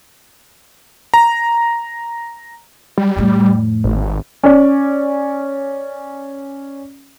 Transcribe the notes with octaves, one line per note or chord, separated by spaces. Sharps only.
A#5
G3
F2 A2
G#1
C#4 D5